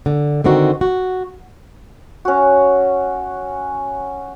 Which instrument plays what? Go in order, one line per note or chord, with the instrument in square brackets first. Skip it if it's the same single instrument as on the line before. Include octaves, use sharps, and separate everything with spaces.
[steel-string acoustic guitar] D3
D3 D#3 C4 D#4 F#4
F#4
[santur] C#4 F#4